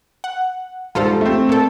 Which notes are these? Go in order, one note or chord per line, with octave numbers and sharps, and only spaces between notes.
F#5
G#2 G3 F4 A4 C5
A3 C4
A#2 A4